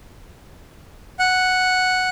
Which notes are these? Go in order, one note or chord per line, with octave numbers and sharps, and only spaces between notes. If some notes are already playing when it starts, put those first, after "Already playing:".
F#5